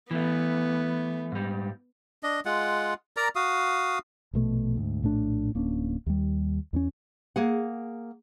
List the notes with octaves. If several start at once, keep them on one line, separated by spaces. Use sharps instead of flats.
E3 A3 B3
G#2 G3
D4 D#5
G#3 F4 F#5
A#4 D5 A#5
F#4 F5 D#6
A#1 B2 A3
D2 G#2
A#1 A2 A3 D4
D1 A#3 C#4 D4
D#2 G3
E2 B3 C#4
A#3 G#4 F#5